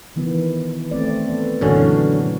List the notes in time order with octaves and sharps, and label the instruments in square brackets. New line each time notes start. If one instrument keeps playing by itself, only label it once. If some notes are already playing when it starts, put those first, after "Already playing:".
[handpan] D#3 E3 B3
A3 C4 D5
B3
[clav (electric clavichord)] F#2 D3 C#4 [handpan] A#2 E3 F#3